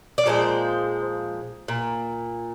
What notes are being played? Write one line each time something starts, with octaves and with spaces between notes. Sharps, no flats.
D5
A#2 F3 G#3 C5
A#2